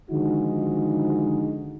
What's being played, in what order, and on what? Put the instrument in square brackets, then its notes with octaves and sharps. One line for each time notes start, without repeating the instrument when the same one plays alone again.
[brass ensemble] D3 D#3 F3 G#3 D#4 F#4